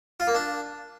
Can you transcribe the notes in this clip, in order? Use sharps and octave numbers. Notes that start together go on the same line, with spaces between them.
F4
A#3
D4